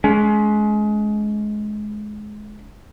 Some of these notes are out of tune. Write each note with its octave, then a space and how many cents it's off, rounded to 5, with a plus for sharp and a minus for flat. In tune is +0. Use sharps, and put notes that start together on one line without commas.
G#3 +25 C#4 +30